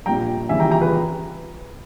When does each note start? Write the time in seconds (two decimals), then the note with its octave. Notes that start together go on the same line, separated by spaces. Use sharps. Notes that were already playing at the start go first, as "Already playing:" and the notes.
0.06 A#1 A#2 G3 G5 A#5
0.49 D#2 C#3 E3 G3 E5 G#5
0.60 G5 A#5
0.71 G5 A#5
0.81 G#4 B4